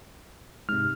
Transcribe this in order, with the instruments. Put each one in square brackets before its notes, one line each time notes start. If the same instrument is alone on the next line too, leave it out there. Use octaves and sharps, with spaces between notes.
[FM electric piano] G#2 C3 [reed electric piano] F6